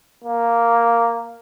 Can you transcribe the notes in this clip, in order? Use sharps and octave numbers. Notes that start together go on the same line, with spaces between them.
A#3